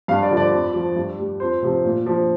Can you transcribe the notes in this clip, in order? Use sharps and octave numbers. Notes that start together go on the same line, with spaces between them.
G2 F5
D5
D3 F3
D5
F2
F3
G2
G3
F2 C5
C3 F3
A#2
F3